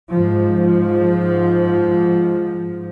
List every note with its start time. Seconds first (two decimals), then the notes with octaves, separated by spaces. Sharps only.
0.13 G#2 F3